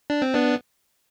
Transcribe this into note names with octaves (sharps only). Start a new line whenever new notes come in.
D4
C4
B3 D4